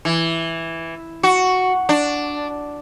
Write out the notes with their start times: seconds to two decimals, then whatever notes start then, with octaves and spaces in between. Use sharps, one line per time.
0.05 E3
1.23 F#4
1.89 D4